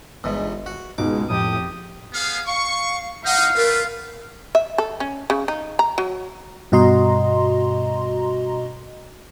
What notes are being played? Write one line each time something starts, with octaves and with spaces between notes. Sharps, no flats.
G1 E2 G#2 B2
F#4
C#2 G#2 B2 G#3 D6
F2 A2 G4 D#6
B3 G#4 F5
F5 C#6
D#4 F5 F#5
A3 F4 A#4 B4
E5
A4
C#4
C#3
D#4
A#5
F#3
G2 B2 F#4 D#5 A#5 C6